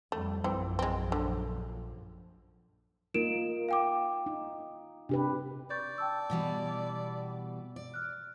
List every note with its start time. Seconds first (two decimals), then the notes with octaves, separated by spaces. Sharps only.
0.12 F2 G3 A3
0.44 A#1 F#2 E3 F3 C4
0.79 G#3 C4
1.12 D3
3.14 A#3 D#4 F4 A#4 D7 E7
3.69 F5 G5 D6
4.26 D#4
5.09 C3 D4 G4 B4
5.70 D5 C#6 G6 A6
5.98 G5 A5 E6
6.30 B2 E3 G3
7.76 D5
7.94 F6 F#6